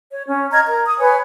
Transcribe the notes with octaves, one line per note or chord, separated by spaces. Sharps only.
C#5
C#4
D#5 A#5 F6 G#6
A#4 A#5
D#6
B4 C#5 G#5